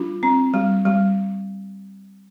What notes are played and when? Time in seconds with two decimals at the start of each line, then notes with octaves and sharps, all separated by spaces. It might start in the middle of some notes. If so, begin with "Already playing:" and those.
Already playing: G3 D4 F4
0.23 C4
0.54 G3
0.85 G3